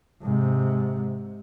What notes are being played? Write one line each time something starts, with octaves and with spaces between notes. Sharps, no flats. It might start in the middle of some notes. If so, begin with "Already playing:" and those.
G#2 C3